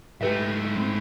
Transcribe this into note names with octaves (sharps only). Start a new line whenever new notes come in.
G#2 A3 G4 B4 E5
C4